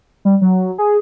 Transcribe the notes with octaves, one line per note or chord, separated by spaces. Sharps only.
G3
F#3
G#4